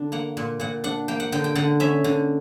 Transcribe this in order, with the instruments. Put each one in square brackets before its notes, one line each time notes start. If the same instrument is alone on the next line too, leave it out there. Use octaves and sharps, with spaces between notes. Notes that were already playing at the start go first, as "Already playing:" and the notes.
Already playing: [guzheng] D3 D4
A#3 F#5
A#2
A#2 F#5
D4 F#5
A#3 G5
F#5
D3 G5
G5
D3 F#5
C#4 E5
D3